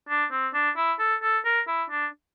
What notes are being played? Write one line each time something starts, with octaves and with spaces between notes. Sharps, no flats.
D4
C4
D4
E4
A4
A4
A#4
E4
D4